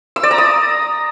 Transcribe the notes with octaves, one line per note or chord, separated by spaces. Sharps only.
E6
D5
A#5
D#6